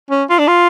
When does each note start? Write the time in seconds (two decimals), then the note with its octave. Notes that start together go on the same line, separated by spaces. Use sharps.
0.10 C#4
0.29 F4
0.39 D4
0.48 F4